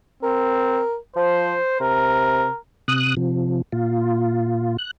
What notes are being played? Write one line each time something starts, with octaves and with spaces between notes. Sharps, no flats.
C4 A#4
F3 C5
C3 A#4
C3 D#6 F#6
C3 F3
A#2 F4
F#6